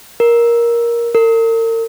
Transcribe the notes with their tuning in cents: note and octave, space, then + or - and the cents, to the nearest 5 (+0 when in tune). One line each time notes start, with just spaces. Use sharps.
A#4 +10
A#4 -40